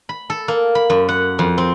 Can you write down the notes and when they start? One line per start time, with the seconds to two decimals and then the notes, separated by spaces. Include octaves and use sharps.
0.09 B5
0.30 A4
0.48 A#3
0.75 B5
0.90 F#2
1.09 F#5
1.39 F2
1.58 C4